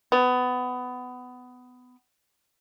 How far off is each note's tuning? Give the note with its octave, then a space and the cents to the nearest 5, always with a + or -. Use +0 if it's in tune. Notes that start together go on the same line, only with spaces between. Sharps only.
B3 +20